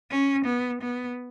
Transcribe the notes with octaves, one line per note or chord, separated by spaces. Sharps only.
C#4
B3
B3